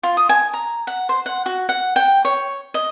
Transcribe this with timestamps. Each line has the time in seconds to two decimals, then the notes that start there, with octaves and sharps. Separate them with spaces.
0.03 F4
0.17 D#6
0.29 G#5
0.53 A#5
0.87 F#5
1.09 C5
1.26 F#5
1.46 F#4
1.69 F#5
1.96 G5
2.25 C#5
2.74 D#5